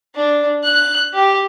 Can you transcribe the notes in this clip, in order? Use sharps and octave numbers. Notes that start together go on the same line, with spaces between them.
D4
F#6
G4